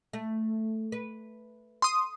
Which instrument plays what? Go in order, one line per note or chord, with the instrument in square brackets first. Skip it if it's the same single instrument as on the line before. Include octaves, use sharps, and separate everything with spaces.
[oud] A3
B4
[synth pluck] C6 D#6